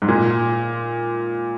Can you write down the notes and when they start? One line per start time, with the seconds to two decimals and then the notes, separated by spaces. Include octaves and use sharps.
0.02 G#2
0.08 A#2